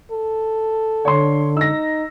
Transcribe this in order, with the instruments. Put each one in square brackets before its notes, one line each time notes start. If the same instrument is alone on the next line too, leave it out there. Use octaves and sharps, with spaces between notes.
[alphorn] A4
[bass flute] D3 [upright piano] C#5 C6
[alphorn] D#4 [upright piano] E6 A#6